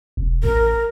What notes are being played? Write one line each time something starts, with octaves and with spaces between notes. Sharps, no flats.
E1
A1 A#4